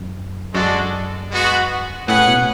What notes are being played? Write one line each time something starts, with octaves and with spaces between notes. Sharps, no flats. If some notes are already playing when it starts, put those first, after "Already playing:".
Already playing: F#2
F#2 G#3 D4 F#4 A4 D5
G#3 B3 F#4
A2 C#4 G#4 B4 F#5
B2